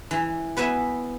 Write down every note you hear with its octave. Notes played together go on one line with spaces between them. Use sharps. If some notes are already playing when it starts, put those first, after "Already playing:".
E3
B3 B4 E5 G#5